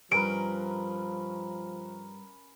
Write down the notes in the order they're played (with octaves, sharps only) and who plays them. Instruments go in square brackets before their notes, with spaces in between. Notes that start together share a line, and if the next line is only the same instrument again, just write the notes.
[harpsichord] G2 [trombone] F3 [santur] C#4 A#4 B4 [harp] D7